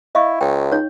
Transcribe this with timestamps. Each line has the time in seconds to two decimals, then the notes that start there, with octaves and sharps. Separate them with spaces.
0.15 E4 D#5 F5 C#6
0.41 C#2 G5
0.71 D#4 C#5